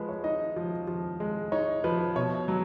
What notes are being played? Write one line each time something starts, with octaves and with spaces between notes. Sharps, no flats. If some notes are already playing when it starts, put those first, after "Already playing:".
Already playing: F3 G#3 B4
C#5
D#4 D#5
F3
F3
G#3
D#4 C#5
F3 B4
B2 C#5
F#3